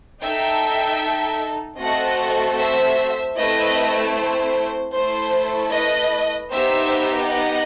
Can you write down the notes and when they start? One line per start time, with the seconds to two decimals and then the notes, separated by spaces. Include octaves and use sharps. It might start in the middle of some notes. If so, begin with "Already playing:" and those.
0.22 D#4 A4 E5 G5
1.78 A3 C4 F#4 A4 D#5 F#5
2.57 C5 E5
3.36 A3 C4 E4 B4 D#5
4.15 C5
4.93 A3 E4 A4 C5
5.72 B4 D#5
6.50 B3 D#4 G4 C5 E5
7.29 D#5 F#5